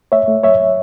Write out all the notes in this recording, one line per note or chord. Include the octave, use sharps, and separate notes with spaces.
A3 C#5 E5
A3
F#3 C#5 E5